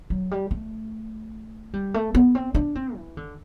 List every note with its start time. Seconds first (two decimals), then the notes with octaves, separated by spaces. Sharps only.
0.10 F#3
0.31 G3
0.51 A3
1.73 G3
1.94 A3
2.15 B3
2.35 C4
2.55 D4
2.75 C4
2.96 E3
3.17 D3